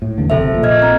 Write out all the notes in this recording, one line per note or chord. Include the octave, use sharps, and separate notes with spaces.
A2
E2 D3
F#1 C3 A4 C5 E5
A#1 A#2
D#5 F6 G#6
C4 A#5